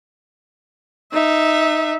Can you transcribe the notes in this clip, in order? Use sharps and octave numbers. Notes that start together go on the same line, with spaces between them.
D#4 E5